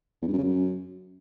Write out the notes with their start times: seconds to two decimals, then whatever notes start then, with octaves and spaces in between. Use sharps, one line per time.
0.22 E2
0.27 G2
0.33 F#2
0.38 C#3
0.43 F#2